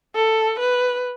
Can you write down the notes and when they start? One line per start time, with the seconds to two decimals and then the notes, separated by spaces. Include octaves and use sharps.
0.15 A4
0.59 B4